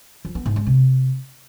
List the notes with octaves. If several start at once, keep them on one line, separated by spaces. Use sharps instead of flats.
F3
B3
G#2
G#3
C3